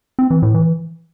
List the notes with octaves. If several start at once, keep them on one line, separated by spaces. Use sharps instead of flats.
C4
E3
A2
E3